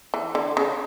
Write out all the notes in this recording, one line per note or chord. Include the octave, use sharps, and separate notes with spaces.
E3
D3
C#3